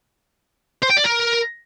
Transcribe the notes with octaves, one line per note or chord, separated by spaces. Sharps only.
C5
G5
D5
A#4